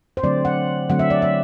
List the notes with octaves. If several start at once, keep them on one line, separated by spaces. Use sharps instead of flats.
C5
D3 F#3 A3 C4 D5
F#5
D3 F#3 A3 C4 F#5
E5
D5
E5